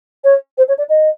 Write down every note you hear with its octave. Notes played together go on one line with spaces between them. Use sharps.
C#5
C5
C#5
D5
D#5